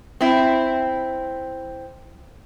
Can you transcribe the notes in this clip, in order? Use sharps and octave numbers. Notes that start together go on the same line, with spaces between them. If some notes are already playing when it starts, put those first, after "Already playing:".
C4 E4